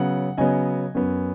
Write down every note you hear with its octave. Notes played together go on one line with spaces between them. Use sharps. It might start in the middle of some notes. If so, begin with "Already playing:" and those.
Already playing: C#3 F#3 B3 F#5
C#3 F#3 B3 D#5 G#5
F#2 F#3 B3